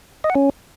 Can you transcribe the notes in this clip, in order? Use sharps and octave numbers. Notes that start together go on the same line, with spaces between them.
D#5
F#5
C#4